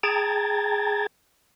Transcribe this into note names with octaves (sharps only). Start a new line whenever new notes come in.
G#4 G5 A5 A#5 G#6 A6